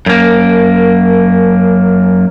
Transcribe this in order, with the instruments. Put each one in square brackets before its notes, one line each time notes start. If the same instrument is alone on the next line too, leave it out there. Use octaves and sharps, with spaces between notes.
[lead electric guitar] F#2 A#3